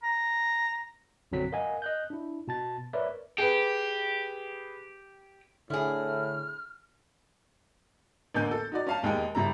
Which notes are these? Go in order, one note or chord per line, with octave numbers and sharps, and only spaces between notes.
A#5
B1 F#2 D3 F#3 C4 B6
A#4 D#5 F5 F#5 G#5
D#5 F#6 G6
D4 E4
B2 A5 A6
A#4 B4 C#5 D5 E5
G4 G#4 B4
A2 D3 E4 G#4 F6
A1 E2 D3 A#3 G#5 G6
A4
D#4 F#4 D5
C#4 F5 A5
E1 D#2 G#3 G4 G5 G#5
G1 C#3 G3 E4 A#5